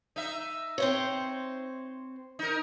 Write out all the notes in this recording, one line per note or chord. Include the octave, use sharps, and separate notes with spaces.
D#4 E5
C4 C5 C#5
D#4 A#4